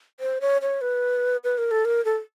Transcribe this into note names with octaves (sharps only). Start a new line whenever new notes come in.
C5
C#5
C#5
B4
B4
A#4
A4
A#4
A4